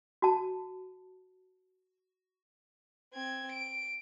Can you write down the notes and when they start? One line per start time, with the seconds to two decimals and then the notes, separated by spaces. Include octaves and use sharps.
0.22 F#4 A5
3.13 C4 G#6
3.53 D7